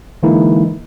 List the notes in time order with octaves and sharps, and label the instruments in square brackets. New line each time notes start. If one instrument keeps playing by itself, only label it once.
[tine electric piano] D3 E3 G#3 A#3 D#4 E4